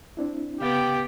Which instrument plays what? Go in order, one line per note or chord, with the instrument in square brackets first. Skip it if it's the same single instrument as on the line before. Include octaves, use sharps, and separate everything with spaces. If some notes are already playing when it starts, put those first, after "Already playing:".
[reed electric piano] C4 D4 E4
[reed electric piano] C#3 F5 A6 [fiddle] B3 G5 [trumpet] G4